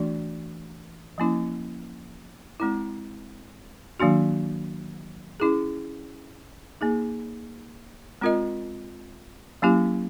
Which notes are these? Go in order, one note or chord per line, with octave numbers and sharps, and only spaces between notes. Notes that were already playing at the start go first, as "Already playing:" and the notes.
Already playing: E3 A3 D4 F#4
F3 A#3 C#4 E4
G#3 C4 E4
D#3 F#3 A#3 D4 F#4
C#4 E4 G#4
A#3 D#4 G#4
G#3 C4 F4 A#4 D#5
F#3 A#3 C#4 E4 G4